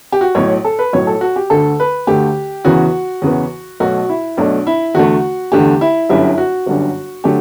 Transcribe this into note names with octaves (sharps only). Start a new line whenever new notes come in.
G4
F#4
B1 A2 F#3 C#5
A4
B4
B1 A2 F#3 C#5
A4
F#4
G4
D2 D3 A3 A4
B4
D2 D3 A3 G4
E2 C#3 E3 B3 F#4
E2 C#3 E3 B3
B1 B2 A3 F#4
E4
B1 B2 A3 D4
E4
E2 D3 A3 F#4
E2 D3 A3 G4
E4
G1 F#2 D3 G3 E4
F#4
G1 F#2 D3 G3
D3 F#3 A3 G4